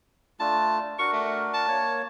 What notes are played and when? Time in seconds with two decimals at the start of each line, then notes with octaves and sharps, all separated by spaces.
0.40 A3 D4 F4 A5
0.99 D4 F#4 A#4 C#6
1.13 A3
1.54 A5
1.68 A#3 C#5